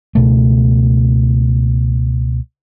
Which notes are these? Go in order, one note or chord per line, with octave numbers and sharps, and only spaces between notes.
C#2 B2 A3